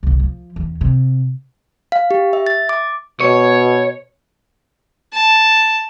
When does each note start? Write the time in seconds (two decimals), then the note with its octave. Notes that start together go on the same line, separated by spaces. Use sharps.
0.03 C2 C#3
0.20 F3
0.56 E2 C#4
0.81 C3
1.92 F5
2.11 G4
2.33 E5
2.47 A6
2.69 D6
3.20 B2 C#5
5.14 A5